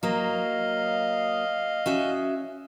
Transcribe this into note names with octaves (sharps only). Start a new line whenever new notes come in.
F#3 A#3 D#5 F5
C#4 F#4 E5